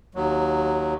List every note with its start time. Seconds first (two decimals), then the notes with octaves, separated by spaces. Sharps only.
0.15 D#2 F#3